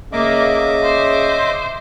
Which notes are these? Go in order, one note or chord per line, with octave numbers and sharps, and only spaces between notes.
C#3 A#3 D#5 E5 D6
C5